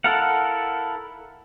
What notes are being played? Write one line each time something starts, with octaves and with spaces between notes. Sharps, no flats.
E4 A4 A#4 F5 F#5